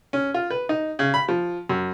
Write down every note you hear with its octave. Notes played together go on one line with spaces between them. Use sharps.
C#4
F4
B4
D#4
C#3
B5
F3
F#2